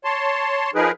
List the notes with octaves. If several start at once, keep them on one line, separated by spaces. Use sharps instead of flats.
C#5 A5 C6
F3 D#4 G#4 A#4 B4